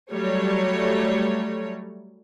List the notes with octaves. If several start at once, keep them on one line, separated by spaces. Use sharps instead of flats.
F#3 G3 A3 C#5